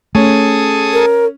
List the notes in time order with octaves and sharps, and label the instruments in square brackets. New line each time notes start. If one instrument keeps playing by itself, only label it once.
[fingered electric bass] A3 [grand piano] C#4 [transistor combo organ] G#4 A4 D#6
[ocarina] A#4